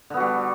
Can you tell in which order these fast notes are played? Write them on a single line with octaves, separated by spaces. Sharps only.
D3 B3 F#4 G3